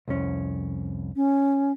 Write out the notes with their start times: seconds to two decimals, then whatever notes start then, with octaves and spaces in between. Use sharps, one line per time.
0.08 C2 F2 C#4
1.16 C#4